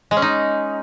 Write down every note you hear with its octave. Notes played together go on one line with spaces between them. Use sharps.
G#3
C#4
D#4